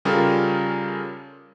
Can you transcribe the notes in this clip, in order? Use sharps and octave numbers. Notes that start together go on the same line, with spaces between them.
C#3 G3 C#4 F4 A4 A#4